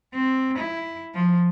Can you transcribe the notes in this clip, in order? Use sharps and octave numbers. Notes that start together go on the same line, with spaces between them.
C4
E4
F3